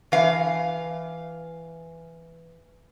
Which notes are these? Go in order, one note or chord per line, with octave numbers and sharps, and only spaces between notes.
E3 F5